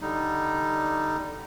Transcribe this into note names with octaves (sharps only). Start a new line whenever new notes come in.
D3 G3 D#4